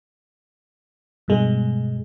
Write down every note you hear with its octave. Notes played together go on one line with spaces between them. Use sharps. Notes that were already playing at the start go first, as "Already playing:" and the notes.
G2 B2 G#3